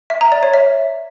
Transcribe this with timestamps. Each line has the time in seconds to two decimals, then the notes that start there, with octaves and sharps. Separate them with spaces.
0.10 E5
0.21 A#5
0.32 D5
0.43 C#5
0.54 E5